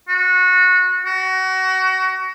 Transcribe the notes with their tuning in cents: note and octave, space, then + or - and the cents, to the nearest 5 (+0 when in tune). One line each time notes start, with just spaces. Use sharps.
F#4 -20
F#4 +25